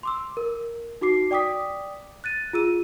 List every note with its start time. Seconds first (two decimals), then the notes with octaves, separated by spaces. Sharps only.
0.03 C6 D6 E6
0.37 A#4
1.01 D#4 F#4 D6 C7
1.31 D5 G5 D6 D#6 B6
2.24 F#6 A6 D#7
2.53 F4 G#4 E6 D#7